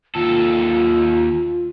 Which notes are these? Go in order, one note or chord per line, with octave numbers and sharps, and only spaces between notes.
D#2 F4 A4